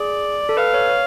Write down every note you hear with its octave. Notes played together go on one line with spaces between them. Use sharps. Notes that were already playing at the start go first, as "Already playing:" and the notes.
Already playing: G#4 D5
A4
B4 F5
C#5
C#5